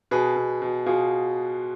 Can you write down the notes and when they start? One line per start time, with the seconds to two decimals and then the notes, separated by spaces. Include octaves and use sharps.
0.11 B2 G#4 B4
0.36 B2
0.62 B2
0.86 B2 F4 G#4